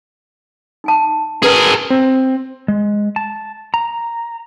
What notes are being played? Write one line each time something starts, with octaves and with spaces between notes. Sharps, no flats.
D#4 G#5 A5
C#4 G#4 A#4 B4
C4
G#3
A5
A#5